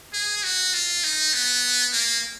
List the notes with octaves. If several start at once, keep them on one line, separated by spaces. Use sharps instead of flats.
G#4
F#4
F4
D#4
B3
A#3